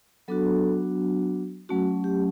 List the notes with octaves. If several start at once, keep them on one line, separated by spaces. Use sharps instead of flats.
F#3 B3 D4 F#4 A4
F#3 A3 C#4 F#4
G4